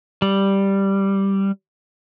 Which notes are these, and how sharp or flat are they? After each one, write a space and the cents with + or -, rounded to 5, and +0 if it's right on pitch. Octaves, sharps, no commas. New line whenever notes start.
G3 +0